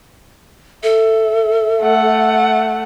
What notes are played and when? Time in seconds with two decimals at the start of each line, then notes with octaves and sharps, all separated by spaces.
0.83 A4 E5
1.81 A3 F#5